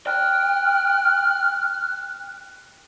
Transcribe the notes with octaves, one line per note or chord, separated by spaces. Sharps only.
G5 F6 F#6